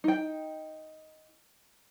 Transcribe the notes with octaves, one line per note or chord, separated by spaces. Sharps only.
D#4 G5